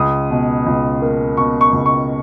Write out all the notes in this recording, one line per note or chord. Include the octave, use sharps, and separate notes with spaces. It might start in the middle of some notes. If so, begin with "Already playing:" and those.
Already playing: C#2 D#6
B2
C#2
A#3
B2 C#6
C#6
C#2
C#6